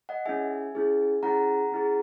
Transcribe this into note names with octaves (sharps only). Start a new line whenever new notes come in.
D#5 F#5
C#4 E4 G#4 E5 G#5
C#4 E4 G#4
C#4 E4 G#4 F#5 A#5
C#4 E4 G#4